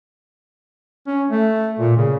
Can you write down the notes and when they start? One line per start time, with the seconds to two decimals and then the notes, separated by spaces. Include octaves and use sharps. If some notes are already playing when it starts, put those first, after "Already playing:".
1.07 C#4
1.30 A3
1.79 A#2
1.97 C#3